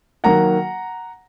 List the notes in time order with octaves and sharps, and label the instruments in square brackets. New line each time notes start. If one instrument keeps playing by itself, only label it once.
[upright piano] D#3 F#3 A#3 F#5 A#5